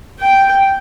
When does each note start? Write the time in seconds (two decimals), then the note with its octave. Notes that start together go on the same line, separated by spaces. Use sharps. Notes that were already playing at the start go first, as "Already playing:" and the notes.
0.20 G5